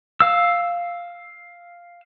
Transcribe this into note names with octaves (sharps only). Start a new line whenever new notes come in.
F5 E6